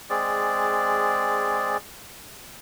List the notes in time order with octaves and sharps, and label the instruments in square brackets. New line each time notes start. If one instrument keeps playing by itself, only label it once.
[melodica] G#3 C4 G#4 D5